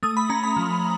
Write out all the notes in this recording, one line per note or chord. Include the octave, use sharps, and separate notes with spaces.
A3 D#6
B5
C#4 A#5
B5
F3